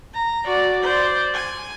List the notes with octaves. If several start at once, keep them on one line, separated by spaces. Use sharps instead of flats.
A#5
F#4 D5
C5 D5
G#5